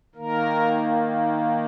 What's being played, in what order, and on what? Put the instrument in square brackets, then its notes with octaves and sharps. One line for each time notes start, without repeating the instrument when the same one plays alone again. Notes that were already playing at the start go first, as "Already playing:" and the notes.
[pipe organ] D#3 A#3 A#4